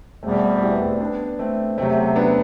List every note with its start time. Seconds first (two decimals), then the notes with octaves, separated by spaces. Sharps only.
0.23 E2 B2 G3 A3 C4
0.61 E4 G4
0.72 B3
0.81 A3 C4
1.00 B3 D4
1.39 A3 C4
1.78 E2 C3 F#3 A3 C4
2.16 B3 D4